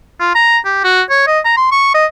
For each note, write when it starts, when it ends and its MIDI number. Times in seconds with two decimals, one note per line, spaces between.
0.20 0.34 65
0.35 0.58 82
0.65 0.82 67
0.84 1.02 66
1.10 1.23 73
1.27 1.39 75
1.45 1.57 82
1.57 1.68 84
1.72 1.94 85
1.94 2.05 75